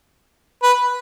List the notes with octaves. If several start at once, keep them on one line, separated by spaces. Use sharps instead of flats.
B4